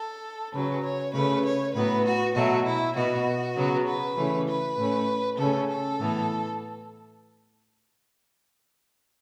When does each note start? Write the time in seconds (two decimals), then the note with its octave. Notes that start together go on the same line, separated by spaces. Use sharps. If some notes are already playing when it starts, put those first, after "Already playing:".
Already playing: A4
0.53 C#3 F#3 C#4 B4
0.84 C#5
1.13 C#3 A3 C#4 B4
1.44 C#5
1.74 A2 F#3 B3 B4
2.05 F#4
2.35 B2 F#3 A3 F#4
2.66 E4
2.96 B2 B3 F#4
3.56 C#3 F#3 B3
3.86 B4
4.17 C#3 E3 A3 C#4
4.47 B4
4.76 A2 A3 C#4
5.37 C#3 A3 C#4 A4
5.68 A4
5.99 A2 E3 B3